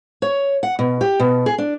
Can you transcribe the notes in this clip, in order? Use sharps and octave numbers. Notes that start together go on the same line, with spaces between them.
C#5
F#5
B2
G4
B2
G#4
D4